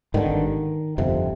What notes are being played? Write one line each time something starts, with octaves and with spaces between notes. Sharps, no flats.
G#1 G2 D3 D#3
G1 F2 C3